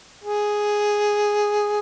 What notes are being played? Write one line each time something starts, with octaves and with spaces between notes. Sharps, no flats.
G#4